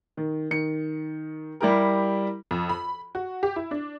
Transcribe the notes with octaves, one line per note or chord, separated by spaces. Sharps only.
D#3
D#3 C#7
G3 E4 G4 A#4
F2
B5
F#4
G4
E4
D4